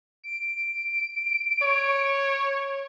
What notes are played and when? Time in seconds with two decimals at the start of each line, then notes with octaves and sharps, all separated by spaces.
0.24 D7
1.63 C#5